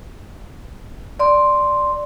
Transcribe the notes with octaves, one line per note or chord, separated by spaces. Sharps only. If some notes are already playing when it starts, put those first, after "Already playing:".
D5 C6